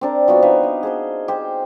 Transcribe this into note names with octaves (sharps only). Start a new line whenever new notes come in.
C4 D4 A#4
F3 B3 F#4
D#4 B4 E5 F5
D#5
G#4 C5 C6
G4 C5